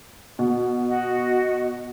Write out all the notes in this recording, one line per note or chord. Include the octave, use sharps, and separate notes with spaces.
B2
F#4 D#5